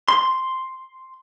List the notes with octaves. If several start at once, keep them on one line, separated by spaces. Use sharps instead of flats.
C6